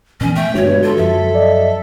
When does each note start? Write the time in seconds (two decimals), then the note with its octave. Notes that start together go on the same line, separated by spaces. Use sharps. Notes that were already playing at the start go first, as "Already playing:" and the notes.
0.21 A#2 E3 B3 C#4
0.35 A3 G5
0.55 G2 B2 D3 G#3 D4 F#4 C#5
0.83 F4 A4
0.97 F#2 F3 E5
1.35 D5 D#5